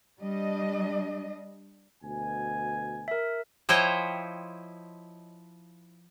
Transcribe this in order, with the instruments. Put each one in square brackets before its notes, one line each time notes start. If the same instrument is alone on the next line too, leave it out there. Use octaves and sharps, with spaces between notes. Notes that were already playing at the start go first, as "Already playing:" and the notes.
[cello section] G3 D4 D#5
[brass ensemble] D2 B2 G#5
[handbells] A#4 E5
[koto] F3 E4 C5 C#5 D#5 G5